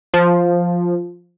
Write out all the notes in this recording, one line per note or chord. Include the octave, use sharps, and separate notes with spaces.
F3